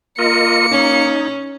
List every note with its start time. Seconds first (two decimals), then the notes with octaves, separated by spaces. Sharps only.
0.19 A#3 F4 A#4 D#5 C#7
0.71 C#4 D#4